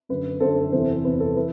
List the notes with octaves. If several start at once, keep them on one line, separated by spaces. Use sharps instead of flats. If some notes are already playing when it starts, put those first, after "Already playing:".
F#2 D3 B4
F#2 D3 A4 C5
E2 C3 E3 A4 C5
E2 C3 E3 B4
A4
E3 B4